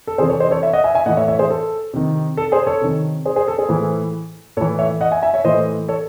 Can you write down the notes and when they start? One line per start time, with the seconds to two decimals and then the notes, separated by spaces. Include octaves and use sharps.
0.07 A4
0.18 C3 G#4 C5
0.21 E3
0.29 A4 C#5
0.40 C5 D#5
0.51 A4 C#5
0.62 C#5 E5
0.73 D#5 F#5
0.84 E5 G#5
0.95 E5 G#5
1.06 A2 E3 D#5 F#5
1.17 C#5 E5
1.28 C#5 E5
1.39 G#4 C5
1.50 A4
1.94 C3 D#3
2.37 A4
2.52 G#4 C5
2.67 A4 C#5
2.81 C3 D#3
3.25 G#4 C5
3.36 G#4 C5
3.48 A4
3.58 G#4 C5
3.69 A2 E3
4.57 A2 A4 C#5
4.61 E3
4.79 C#5 E5
5.01 D#5 F#5
5.11 E5 G#5
5.22 E5 G#5
5.34 C#5 E5
5.45 A2 E3 C5 D#5
5.89 A4 C#5